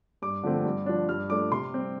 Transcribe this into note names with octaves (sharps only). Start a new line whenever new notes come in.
G2 D6
D3 F3 A3 C4
G2
F3 D4
G2 F6
F3 A3 D4 D6
C3 C6
G3 C4